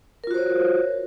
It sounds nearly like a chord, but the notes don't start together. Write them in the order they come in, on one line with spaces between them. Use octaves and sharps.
A#4 F4 F#4 C5 C#5